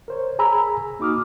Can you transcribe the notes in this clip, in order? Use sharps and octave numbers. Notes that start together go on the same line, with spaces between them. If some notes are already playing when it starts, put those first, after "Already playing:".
A#4 C5 C#5
G#4 G#5 A#5 B5 E6
A#3 D#4 F#4 D6 D#6 F6